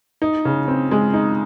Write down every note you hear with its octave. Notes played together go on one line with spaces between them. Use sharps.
D#4
C#3
C4
G#3
D#4